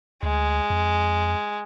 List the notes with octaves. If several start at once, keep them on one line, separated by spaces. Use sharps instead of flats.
D2 G#3
F2